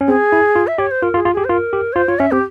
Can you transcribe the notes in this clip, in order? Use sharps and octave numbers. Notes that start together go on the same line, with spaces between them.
C#4
C4 G#4
E4
F4
E5
G4 C#5
C5
F4 A#4
F4
G#4
F4
G4 G#4
C5
F4 A#4
G4
C#5
F4 C5
F4 C#5
C#4 E5
C4 G4